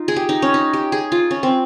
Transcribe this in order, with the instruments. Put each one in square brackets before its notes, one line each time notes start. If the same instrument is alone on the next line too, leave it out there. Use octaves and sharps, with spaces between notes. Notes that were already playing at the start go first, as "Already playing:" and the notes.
Already playing: [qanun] D#4 F4
G#4
G4
D#4
C#4
D#4
G4
G#4
F4
C#4
C4